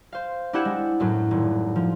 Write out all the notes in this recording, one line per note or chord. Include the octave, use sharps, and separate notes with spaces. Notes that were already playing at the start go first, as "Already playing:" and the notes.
C5 F5
D4 E4 G4 F#5 G#6 E7
G#3
F#2 A2 F#3
D#1
F3